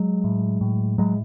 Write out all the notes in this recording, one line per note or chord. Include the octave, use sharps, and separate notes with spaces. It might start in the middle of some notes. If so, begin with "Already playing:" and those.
Already playing: F#3 G#3
A2
A2
A2 F#3 G#3